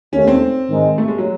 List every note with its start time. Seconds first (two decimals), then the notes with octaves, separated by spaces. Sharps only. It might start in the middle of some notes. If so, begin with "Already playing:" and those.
0.12 D#2 D#3 A3 C#4
0.27 C4
0.70 G#2 D#3 G#3 D#4
0.98 A3
1.08 G#3
1.18 F#3